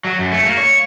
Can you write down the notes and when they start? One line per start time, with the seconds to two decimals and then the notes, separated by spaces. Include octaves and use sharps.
0.05 F#3
0.19 F#2
0.32 A3
0.46 A#3
0.57 C#5